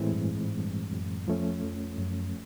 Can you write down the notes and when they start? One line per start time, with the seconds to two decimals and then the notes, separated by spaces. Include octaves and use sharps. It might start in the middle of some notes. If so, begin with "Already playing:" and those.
Already playing: A2 E3 G#3 C4
0.12 G2
0.35 G#2
0.58 G2
0.93 F#2
1.28 F2 F3 A3 C#4
1.63 F2
1.98 F#2